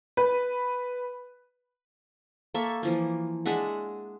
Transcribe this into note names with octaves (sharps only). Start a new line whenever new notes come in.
B4
A#3 A4 E5 C#6
E3 F3 A#3
G#3 D4 E5 F#5